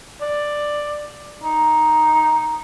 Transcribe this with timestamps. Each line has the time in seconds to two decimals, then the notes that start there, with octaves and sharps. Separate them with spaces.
0.21 D5
1.43 D#4